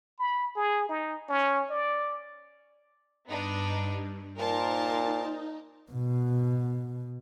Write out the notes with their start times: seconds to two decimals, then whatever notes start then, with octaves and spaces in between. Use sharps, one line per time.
0.19 B5
0.56 G#4
0.89 D#4
1.29 C#4
1.70 D5
3.27 G2 B3 D4 D#4
4.37 A#2 D#4 A#4 C5 A5
5.92 B2